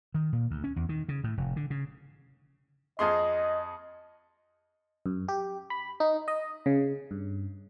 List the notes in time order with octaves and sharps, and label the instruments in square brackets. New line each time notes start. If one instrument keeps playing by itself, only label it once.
[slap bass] D#3
A#2
D2
C#4
E2
D#3
C#3
A2
F1
D3
C#3
[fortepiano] F2 G#4 C6 [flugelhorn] D#5
[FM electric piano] F#2
G4
B5
D#4
D#5
C#3
G2